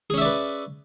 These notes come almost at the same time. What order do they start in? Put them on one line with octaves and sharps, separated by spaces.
G#4 C#4 E5 D5 B4